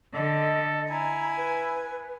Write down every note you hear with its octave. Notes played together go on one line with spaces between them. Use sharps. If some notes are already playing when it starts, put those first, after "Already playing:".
D3 A4 D#5
E4 G#5 A#5
B4